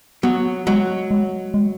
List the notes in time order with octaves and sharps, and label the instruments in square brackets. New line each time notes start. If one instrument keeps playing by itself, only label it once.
[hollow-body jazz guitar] F#3 [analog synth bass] B3
[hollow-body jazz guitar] F#3 [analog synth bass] G#3
[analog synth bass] G#3
G#3